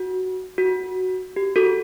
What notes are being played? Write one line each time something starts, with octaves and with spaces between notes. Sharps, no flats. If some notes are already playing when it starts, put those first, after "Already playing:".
Already playing: F#4
F#4
G4
F#4 A4